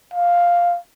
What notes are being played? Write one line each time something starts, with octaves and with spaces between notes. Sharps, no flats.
F5